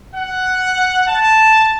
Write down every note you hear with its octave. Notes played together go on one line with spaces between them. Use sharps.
F#5
A5